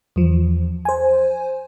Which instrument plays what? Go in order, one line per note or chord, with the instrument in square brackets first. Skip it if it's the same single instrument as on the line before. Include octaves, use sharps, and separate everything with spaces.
[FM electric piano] E2 F3
C5 G#5